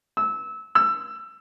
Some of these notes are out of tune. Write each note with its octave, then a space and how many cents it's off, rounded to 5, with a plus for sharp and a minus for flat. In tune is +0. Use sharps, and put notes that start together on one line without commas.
E6 -20
E6 +20